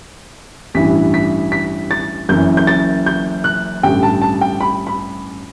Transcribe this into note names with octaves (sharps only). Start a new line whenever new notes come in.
A1 G2 E3 B6
B6
B6
A6
F#1 F#2 E3 G6
G6
A6
G6
F#6
A1 G2 D3 G5
A5
A5
G5
B5
B5